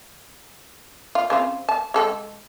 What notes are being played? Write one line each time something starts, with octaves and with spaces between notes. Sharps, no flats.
F4
C#3 C4 F4
A5
G#3 A4 G5